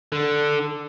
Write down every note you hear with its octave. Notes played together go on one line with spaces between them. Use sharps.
D3